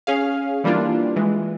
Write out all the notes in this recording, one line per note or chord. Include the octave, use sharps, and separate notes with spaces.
C#4 G#4 F5
E3 G3 A#3 D4 F4
E3 G#3